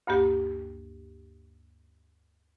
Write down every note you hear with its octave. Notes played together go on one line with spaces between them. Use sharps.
D2 G2 A#3 G4